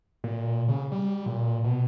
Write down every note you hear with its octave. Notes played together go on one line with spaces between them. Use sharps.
A#2
C#3
G3
A#2
B2